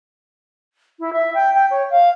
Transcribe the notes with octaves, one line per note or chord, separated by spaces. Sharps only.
E4
E5
G5
G5
C#5
F5